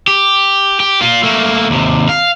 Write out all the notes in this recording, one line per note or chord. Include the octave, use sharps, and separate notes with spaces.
G4
G4
A#3 F4
A3 A#3
D#2 C3
F5